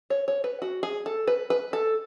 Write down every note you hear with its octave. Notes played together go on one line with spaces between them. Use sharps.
C#5
C#5
B4
F#4
G#4
A4
B4
B4
A4